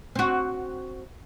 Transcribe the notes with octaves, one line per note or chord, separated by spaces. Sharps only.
C4 F#4